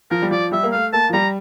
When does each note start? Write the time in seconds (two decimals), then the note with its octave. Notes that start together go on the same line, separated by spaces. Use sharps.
0.11 F3 A#4
0.22 G3
0.31 F3 D5
0.51 G3 E5
0.63 A#3
0.72 A3 F5
0.93 A#3 A5
1.09 F3
1.13 G3 A#5